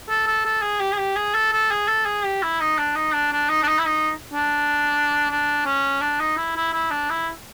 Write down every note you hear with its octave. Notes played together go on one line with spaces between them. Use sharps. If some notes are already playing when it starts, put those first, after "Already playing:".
A4
A4
A4
G#4
G4
G#4
G4
G#4
A4
A4
G#4
A4
G#4
G4
E4
D#4
D4
D#4
D4
D4
D#4
D4
D#4
E4
D#4
D4
D4
C#4
D4
D#4
E4
E4
E4
D4
E4